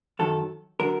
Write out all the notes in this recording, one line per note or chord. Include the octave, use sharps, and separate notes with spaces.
F#2 D#3 F#3 A4
D3 F#3 A#4